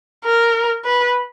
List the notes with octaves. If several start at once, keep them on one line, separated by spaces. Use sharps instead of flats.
A#4
B4